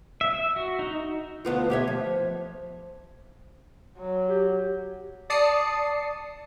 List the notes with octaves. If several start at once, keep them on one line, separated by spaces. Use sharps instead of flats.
E5
E5
F#4
D#4
D2 B3 F4
G4 C#5 E5
F3
F#3
G4
D5 A5 D#6 C7 C#7